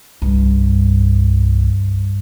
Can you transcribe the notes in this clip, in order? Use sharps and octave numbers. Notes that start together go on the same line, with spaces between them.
C2 G2